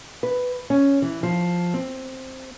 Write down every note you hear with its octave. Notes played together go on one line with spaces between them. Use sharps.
B4
C#4
E3
F3
C4